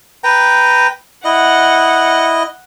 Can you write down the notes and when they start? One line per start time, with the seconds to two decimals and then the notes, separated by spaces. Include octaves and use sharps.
0.24 B4 G5 A#5
1.25 E4 D#5 F#5